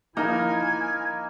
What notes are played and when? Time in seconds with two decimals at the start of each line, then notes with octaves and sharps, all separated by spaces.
0.17 F3 A#3 D#4 E4 A#4 G#5